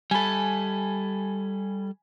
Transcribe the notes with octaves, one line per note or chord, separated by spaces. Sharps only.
G3 A4 G#5 B5